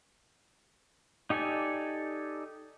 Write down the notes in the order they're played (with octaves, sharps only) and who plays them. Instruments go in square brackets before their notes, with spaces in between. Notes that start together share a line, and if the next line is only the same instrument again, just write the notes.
[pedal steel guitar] D#4 G4 A4 D5 G#5